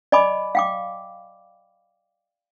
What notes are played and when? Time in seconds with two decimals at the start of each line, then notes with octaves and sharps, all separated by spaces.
0.12 D5 D#5 G#5 B5 D6
0.55 F5 G5 D6